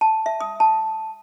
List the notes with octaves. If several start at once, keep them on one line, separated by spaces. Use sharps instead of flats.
A5
E5
D#6
A5